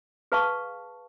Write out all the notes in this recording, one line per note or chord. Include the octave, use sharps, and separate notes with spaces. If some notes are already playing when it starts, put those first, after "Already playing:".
G#4 B4 F5 A5 C#6